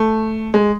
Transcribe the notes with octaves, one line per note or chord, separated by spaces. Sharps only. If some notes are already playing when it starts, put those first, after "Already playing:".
Already playing: A3
G#3